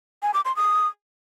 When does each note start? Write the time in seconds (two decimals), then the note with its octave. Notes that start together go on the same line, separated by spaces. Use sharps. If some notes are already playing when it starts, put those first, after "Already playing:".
0.22 G#5
0.34 D6
0.45 C6
0.56 D#6